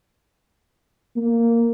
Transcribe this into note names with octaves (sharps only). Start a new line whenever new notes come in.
A#3